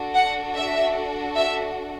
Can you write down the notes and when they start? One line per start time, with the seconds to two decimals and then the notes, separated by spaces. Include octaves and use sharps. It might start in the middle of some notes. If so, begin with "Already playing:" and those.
Already playing: D4 F#4 A4
0.15 F#5
0.55 E5
1.36 E5